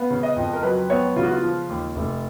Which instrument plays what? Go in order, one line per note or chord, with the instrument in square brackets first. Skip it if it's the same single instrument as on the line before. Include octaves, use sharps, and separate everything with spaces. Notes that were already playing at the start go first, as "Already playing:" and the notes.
Already playing: [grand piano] B3 F5
C#3
D#5
F2
A#4
F#3 B4
B3 C#5
C#3 F4
F#4
F4
F3
D#2
F1